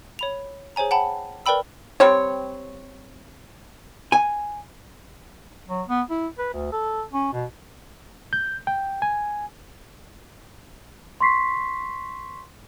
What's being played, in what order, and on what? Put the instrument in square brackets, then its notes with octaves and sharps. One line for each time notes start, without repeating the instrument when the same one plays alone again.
[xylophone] C#5 B5 F7
G#4 C5 C#5 G#5 A#5
F#5 G5 A5 B5
A#4 B4 D5 G5 B5 E6
[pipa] G3 C4 C#5
[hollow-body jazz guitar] G#5
[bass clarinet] F#3
B3
E4
B4
D2
A4
C#4
B2
[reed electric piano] G6
G5
G#5
[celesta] C6 C#6 B6 C7